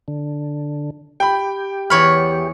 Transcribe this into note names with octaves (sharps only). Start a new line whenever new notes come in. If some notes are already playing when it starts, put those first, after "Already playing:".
D3
G4 G5 B5
E2 C#5 B5 F6